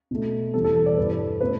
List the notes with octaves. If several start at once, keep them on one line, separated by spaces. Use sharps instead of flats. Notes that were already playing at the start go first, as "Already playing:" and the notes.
B2 A3
E2 B2 G3 A4
A4
A4
D5
G2 E3 G3 B4
A4
B2 A3 B4